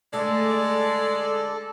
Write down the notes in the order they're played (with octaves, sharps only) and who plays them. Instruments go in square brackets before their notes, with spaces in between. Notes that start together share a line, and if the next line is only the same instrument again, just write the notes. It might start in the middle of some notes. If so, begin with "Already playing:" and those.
[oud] D3 A3 [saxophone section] G#3 D5 [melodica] A4